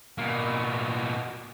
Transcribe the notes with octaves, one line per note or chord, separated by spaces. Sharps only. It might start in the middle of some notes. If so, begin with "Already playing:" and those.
B2 A#3